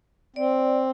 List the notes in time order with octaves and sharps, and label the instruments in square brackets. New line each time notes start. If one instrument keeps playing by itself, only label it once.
[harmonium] C4 [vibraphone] D5